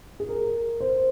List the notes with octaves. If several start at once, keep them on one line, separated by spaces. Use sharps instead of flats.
G#4
A#4
C5